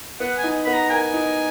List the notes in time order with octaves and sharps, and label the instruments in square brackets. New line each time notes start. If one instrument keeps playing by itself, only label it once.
[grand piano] B3 [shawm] F#5
[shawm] G#5
[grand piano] D#4
[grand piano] B3 [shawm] B5
[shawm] A#5
[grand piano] A#4 [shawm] G#5
[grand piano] D#4